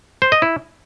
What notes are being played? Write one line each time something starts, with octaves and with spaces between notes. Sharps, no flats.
C5
D#5
E4